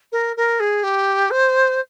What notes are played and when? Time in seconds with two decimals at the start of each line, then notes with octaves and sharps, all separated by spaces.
0.12 A#4
0.37 A#4
0.60 G#4
0.83 G4
1.31 C5